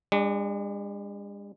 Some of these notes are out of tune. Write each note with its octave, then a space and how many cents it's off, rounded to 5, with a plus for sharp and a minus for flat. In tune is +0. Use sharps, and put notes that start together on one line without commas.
G#3 -45 D4 +0